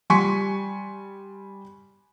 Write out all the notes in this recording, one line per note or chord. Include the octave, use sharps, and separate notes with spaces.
G3 G#5 C6 C#6 B6 C#7